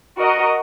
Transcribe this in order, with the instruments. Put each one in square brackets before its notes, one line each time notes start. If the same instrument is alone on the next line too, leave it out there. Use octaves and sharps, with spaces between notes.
[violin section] F#4 A#4 D#5